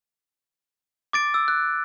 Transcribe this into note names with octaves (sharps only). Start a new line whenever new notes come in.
D6 A6 D7
E6
F#6